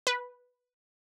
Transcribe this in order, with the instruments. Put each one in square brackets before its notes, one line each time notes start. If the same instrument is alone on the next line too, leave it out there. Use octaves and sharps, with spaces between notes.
[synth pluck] B4